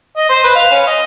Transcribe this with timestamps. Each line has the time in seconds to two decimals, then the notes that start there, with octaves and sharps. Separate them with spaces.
0.17 D#5
0.29 C5
0.44 B4
0.55 F5
0.71 C#4
0.87 D#5